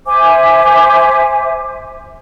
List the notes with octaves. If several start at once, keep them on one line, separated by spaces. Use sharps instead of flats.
C5 E5 G#5 D6